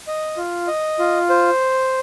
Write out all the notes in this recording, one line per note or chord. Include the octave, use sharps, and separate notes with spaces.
D#5
F4
D#5
F4
C5